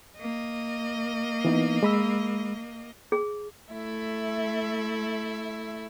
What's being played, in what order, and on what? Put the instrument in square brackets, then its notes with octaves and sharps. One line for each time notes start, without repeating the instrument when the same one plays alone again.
[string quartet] A#3 D#5
[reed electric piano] E3 B3 D#4
G#3 B5 E6
[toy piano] G#4
[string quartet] A3 E4 E5